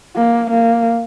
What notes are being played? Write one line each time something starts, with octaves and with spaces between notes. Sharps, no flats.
A#3
A#3